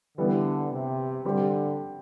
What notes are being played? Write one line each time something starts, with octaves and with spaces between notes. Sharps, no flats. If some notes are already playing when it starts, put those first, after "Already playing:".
D3 E3 G3 B3
C3
D3 G3 C4 G4